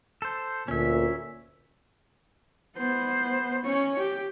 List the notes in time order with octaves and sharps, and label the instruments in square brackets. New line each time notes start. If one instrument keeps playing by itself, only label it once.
[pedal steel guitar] A4 C5
[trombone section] D2 A#2 [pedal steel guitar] C#4 E5
[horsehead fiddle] B3 C5
C#4 C#5
G4